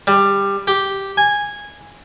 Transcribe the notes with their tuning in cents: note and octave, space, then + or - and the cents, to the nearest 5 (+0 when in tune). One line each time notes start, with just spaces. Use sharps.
G3 +15
G4 -5
G#5 -10